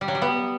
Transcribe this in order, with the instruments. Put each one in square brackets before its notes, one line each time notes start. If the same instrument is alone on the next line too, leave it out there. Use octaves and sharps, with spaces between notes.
[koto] G3
F#3
G3
B3